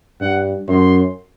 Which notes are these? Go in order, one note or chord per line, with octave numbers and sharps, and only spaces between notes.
G2 F#5
F#2 C6